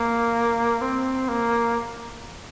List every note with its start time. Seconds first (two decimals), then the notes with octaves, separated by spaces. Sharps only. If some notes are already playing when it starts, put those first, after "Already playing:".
Already playing: A#3
0.81 C4
1.28 A#3